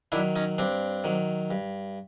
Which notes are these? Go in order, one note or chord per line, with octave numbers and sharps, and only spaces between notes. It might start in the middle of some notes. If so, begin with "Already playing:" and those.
D#3 F#3 D4 E4
C#4 D#4
G2 C4 D4
D#3 F#3
G2